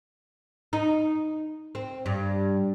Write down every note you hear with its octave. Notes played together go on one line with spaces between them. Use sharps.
D#4
C4
G2